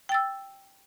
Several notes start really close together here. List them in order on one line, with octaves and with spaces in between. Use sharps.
G5 A6 E6